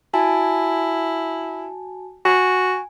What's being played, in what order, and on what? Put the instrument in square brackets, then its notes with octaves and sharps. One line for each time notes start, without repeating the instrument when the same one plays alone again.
[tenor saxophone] E4 [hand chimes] F#4 G#5 A5
[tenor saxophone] F#4 [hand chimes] G#5